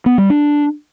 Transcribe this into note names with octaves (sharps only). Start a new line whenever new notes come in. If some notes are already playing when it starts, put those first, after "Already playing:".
B3
G3
D4